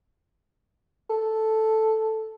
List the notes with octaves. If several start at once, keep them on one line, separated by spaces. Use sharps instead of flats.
A4